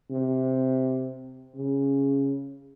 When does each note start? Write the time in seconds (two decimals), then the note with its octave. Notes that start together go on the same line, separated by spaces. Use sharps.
0.10 C3
1.56 C#3